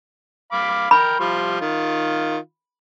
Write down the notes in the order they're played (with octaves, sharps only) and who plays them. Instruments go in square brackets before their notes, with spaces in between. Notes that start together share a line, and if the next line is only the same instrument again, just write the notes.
[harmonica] F5 B5 D6
[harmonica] A#4 G5 [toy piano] B5
[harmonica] F3 G3 C6
D#3 F4